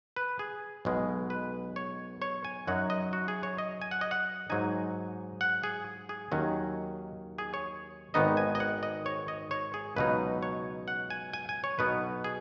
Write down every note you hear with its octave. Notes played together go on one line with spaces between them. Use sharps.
B4
G#4
B1 B2 G#3
B4
C#5
C#5
G#5
F#2 F#3 D#4 F#5
D#5
F#4
G#4
C#5
D#5
G#5
F#5
D#5
F#5
G#2 F#3 D#4 G#5
F#5
G#4
G#4
D#2 D#3 F#3 C#4
G#4
C#5
G#1 G#2 D#3 B3 D#4 D#5
G#5
D#5
F#5
D#5
C#5
D#5
C#5
G#4
C#2 B2 F#3 D#4 B4
C#5
F#5
G#5
G#5
G#5
C#5
B1 B2 B3 D#4 B4
G#4